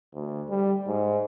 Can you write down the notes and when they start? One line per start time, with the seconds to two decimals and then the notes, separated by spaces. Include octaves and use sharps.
0.14 D2
0.50 G3
0.87 G#2